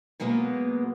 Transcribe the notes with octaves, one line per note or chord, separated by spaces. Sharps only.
B2 F#3 G#3 A#3 B3